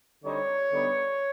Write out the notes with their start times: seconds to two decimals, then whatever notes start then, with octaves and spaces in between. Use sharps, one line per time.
0.22 D3 G3 C4 D#4 C#5
0.71 D3 G3 B3 D#4